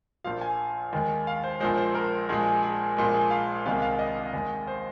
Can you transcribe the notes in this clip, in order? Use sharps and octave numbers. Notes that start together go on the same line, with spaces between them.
A#1 A#2 F3 F5
G#5
D#2 D#3 G#3
F5
C5
A#1 A#2 F3 G#3 C5
C5
A#4
A#1 A#2 G#3 G#4
G#4
G#4
A#1 A#2 G#3
G#4
F5
C2 C3 D#3 G#3 F5
F5
D#5
D#2 D#3 G#3
C5